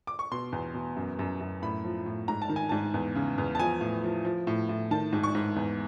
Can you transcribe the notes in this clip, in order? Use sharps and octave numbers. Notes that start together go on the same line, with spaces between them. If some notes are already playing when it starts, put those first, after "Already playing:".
D6
C#6
B2 C6
E2
B2
F#2
F#2
F#2
A2 B5
F3
A2
G#2 A#5
A5
D#3
G#5
G#2 A5
E2
C#3
E2
A5
F3 G#5
A2
F3
F3
A2
A2
D#3 A5
G#2
C#6
G#2
E2